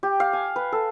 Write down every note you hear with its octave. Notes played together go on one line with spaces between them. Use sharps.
G4
F5
G#5
B4
A4